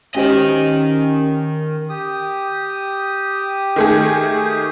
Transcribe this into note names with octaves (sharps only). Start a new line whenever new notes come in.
D#3 C#4 G4 C5 D#5
G4 D#6
D#3 A3 G#4